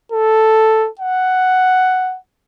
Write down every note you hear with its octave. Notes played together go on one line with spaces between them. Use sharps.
A4
F#5